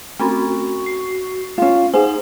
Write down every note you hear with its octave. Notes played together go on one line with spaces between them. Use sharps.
A3 C4 C#4 F#4
C7
C#4 F4 F5
D#4 G#4 C5 F#5 G#5